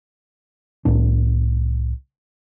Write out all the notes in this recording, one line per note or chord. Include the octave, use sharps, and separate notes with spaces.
C2 A2 D4